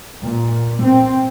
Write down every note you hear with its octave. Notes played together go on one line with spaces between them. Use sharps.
A#2
C4